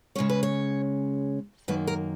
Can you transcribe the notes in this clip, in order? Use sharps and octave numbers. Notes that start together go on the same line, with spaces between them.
C#3 G#3 C#4 C#5
B4
C#5
F#2 D#3 A#3 B4
A#4